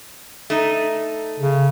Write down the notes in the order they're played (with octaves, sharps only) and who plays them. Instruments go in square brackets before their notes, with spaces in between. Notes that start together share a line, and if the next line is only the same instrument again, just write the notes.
[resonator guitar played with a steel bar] A3 D#4
[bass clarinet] C#3